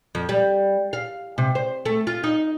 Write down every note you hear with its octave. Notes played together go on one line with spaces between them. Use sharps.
F2
G3
F5
C3
C5
A3
F4
D#4